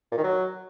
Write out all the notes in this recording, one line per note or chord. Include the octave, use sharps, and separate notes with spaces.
A#2
D#3
F#3